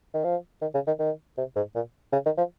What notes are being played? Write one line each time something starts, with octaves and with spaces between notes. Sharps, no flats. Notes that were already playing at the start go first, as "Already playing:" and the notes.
D#3
F3
D#3
C#3
D#3
D#3
C3
G#2
A#2
C#3
D#3
F3